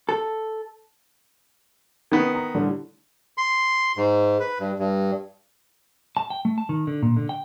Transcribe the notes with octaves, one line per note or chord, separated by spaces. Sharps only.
A4
D#3 B3
A#5
A2 D3 G3
C6
G#2
B4
G2
G2
A5
G5
A3
A5
D#3
D3
A#2
D3
G5